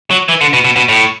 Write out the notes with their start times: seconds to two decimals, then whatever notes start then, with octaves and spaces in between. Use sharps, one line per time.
0.11 F#3
0.29 E3
0.41 D3
0.53 B2
0.64 B2
0.76 B2
0.89 A2